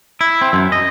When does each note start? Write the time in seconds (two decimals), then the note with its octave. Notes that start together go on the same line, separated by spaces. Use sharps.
0.21 E4
0.41 C4
0.53 F#2
0.72 D#5